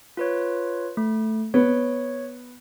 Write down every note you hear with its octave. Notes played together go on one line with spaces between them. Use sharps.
F4 B4 C#5
A3
B3 C#5